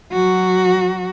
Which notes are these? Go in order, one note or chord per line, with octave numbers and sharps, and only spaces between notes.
F#3 F#4